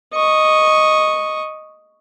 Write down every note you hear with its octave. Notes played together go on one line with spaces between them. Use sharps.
D#5 C#6